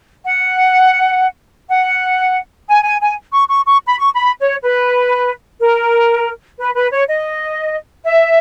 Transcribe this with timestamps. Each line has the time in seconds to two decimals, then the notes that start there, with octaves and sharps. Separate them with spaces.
0.24 F#5
1.70 F#5
2.68 G#5
2.84 G#5
3.01 G#5
3.33 C#6
3.49 C#6
3.66 C#6
3.87 B5
3.98 C#6
4.15 B5
4.40 C#5
4.63 B4
5.61 A#4
6.59 B4
6.75 B4
6.92 C#5
7.08 D#5
8.05 E5